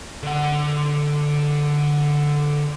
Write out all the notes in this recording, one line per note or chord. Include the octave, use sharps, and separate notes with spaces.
D3 F#5